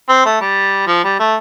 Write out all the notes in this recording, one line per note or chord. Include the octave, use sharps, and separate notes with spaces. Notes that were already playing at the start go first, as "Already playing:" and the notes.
C4
A3
G3
F3
G3
A3